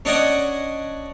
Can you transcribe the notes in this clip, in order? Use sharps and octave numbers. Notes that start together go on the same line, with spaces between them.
C#4 D4 D5 D#5 F#5 G#5